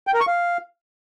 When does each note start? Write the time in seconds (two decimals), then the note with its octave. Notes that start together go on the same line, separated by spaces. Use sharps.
0.07 G5
0.14 A#4
0.20 C#6
0.27 F5